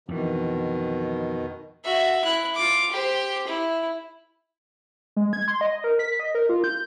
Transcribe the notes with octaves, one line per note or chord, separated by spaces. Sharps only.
F2 B2 D#3 E3
F#4 E5
E4 F#6
F4 D6
G4 C5
E4
G#3
G#6
C6
D#5
A#4
B6
D#5
A#4
F4
G6